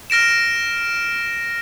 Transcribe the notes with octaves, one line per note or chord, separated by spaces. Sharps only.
F6 A#6 D7 E7